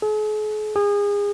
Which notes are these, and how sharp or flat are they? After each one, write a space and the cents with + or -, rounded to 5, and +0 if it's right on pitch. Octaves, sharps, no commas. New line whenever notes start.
G#4 +45
G#4 -30